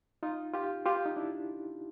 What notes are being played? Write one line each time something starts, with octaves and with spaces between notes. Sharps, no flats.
D#4 F4
F4 G4
F4 G4
D#4
D4 E4